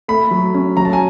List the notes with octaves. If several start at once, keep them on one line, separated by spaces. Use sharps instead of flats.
A3 B5
F#3
C#4
F#3 A#5
A5
G#5